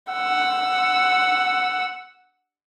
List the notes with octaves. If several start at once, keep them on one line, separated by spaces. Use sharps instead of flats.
F#5 E6